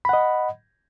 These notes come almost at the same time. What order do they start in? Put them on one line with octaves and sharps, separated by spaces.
B5 F#5 D#5